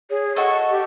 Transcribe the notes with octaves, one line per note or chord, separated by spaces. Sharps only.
G#4 C#5
F#4 A4 D#5 C#6
G4